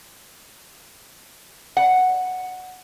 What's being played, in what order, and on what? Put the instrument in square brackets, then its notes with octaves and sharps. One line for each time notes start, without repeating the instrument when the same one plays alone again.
[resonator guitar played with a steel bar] F#5